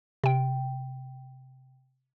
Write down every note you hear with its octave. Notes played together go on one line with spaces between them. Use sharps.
C3 G5